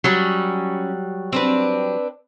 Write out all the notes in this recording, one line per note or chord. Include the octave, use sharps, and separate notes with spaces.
F#3 G3 C#4
C4 D4 B4